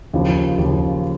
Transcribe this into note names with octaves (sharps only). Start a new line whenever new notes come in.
D#2 C#3 F3
D#2 C#3 F3